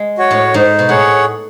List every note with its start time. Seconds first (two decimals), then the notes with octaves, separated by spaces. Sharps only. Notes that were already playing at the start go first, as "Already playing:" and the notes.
Already playing: G#3
0.18 F#4 C#5
0.31 A2
0.54 G#2 D#4
0.79 B2
0.89 A2 G#4 C#5 F#5